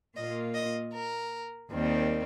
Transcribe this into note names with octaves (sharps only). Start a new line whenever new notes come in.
A#2 A#3 F4 D#5
D#5
A#4
D#2 D#3 G3 C4